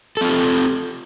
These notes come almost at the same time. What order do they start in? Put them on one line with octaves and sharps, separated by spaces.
A4 C4 F4 G4